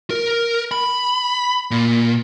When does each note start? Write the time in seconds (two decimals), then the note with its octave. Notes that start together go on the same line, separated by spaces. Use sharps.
0.10 A#4
0.71 B5
1.71 A#2